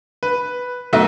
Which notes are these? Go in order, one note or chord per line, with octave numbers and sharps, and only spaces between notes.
B4
B1 A3 E5